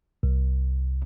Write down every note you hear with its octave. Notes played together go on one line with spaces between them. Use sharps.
C2